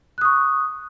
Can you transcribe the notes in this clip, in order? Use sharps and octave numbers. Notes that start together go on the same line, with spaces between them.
C#6 D#6 F#6